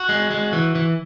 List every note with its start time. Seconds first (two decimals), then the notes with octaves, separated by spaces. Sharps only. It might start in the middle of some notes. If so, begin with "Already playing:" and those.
Already playing: F#4
0.09 G#3
0.31 G#3
0.53 E3
0.75 E3